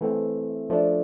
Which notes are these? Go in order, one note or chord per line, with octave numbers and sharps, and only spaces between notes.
E3 A3 C4
F3 A3 D4